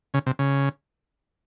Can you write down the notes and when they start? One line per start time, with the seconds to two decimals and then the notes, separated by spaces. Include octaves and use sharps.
0.14 C#3
0.26 C3
0.39 C#3